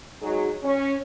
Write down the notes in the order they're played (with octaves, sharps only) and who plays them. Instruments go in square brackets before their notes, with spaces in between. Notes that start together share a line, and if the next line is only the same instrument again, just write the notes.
[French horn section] F#3 G#3 D#4 F#4 G#4
C#4